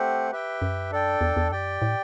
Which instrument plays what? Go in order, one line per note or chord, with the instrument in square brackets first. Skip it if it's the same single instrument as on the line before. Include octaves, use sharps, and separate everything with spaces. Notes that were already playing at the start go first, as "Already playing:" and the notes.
Already playing: [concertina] A3 C4 G4 C5 F#5
G4 B4 E5 G5
[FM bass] F#2
[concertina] D4 A4 D5 G5
[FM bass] E2
E2
[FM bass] F#2 [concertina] G4 D5 G5
[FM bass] A2